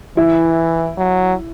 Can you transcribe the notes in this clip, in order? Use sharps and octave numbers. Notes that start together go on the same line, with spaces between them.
E3 E4
F#3